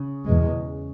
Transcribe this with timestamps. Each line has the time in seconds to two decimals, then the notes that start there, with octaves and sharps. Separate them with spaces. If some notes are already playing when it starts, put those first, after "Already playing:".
Already playing: C#3
0.25 E2 B2 G#3